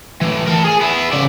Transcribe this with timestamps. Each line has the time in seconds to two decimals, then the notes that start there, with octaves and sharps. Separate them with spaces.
0.21 A2 E3
0.47 A#4 A5
0.65 G#4 G#5
0.81 B3 E4
1.13 C#3 D5